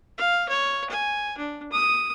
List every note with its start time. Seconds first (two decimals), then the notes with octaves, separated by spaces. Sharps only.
0.18 F5
0.49 C#5
0.90 G#5
1.37 D4
1.72 D#6